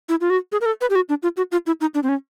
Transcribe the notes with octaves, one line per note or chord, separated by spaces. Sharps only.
E4
F4
F#4
G#4
A#4
A4
B4
G4
F#4
D4
F4
F#4
F4
E4
D#4
D4
C4
C#4